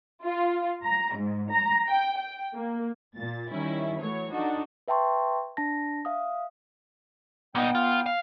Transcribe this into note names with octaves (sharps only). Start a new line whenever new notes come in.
F4
A#5
G#2
A#5
G5
G5
A#3
A#2 A6
D#3 G3 C#4 E4
E3 F#3 A3 C#5
D4 D#4 F#4 A4
B4 E5 G5 A5 C6 C#6
D4 A5 A#6
E5 F5 D#6
A#2 B3 D#4 G5
F4
F5